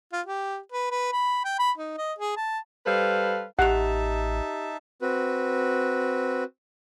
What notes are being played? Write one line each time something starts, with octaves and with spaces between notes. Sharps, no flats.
F4
G4
B4
B4
B5
G5
B5
D#4
D#5
G#4
A5
G3 A4 B4 C5 F5
A1 D#4 G4 E5 F#5 A5 F7
C4 F#4 B4